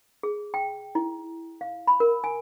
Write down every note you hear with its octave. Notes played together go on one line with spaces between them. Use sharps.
G#4
G5
E4
F5
B5
A#4
G#5